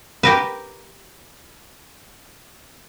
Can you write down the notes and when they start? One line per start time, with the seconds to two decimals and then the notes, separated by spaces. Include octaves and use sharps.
0.23 G4 A#4 B4